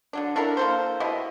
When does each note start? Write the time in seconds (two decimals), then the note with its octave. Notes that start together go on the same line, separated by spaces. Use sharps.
0.13 D3 F#3 D4
0.36 D4 E4 A4 A#4
0.57 A#3 A4 C5
1.00 B2 E4 G4 D#5